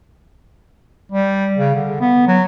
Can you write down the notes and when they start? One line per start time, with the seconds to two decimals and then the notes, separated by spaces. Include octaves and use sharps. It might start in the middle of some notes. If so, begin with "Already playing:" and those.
1.12 G3
1.58 C#3
1.75 D3
2.00 B3
2.27 F#3